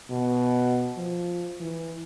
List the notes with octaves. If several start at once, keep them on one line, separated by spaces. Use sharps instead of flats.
B2
F3
E3